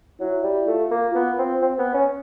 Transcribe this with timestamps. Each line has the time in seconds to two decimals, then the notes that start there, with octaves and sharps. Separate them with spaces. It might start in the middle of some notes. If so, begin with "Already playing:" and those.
0.20 F#3 E4
0.43 G3
0.67 A3 F4
0.91 A#3
1.15 B3 F4
1.38 C4
1.62 C4
1.78 B3
1.94 C#4